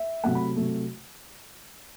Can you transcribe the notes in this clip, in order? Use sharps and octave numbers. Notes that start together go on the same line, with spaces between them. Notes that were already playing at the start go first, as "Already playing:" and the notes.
Already playing: E5
C3 F#3 A3 F#5
B5
C3 F#3 A3